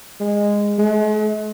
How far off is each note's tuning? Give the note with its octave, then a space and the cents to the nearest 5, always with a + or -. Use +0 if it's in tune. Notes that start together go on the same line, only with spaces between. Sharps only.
G#3 -15
G#3 +45